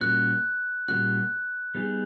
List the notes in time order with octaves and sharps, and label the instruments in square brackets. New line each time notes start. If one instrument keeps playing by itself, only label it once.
[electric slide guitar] A#2 G3 A#3 C#4 F#4 [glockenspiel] F#6
[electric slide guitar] A#2 G3 A#3 C#4 F#4 [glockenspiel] F#6
[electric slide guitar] G3 B3 D#4 G#4